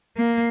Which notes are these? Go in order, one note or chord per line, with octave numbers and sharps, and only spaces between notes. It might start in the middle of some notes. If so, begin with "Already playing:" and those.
A#3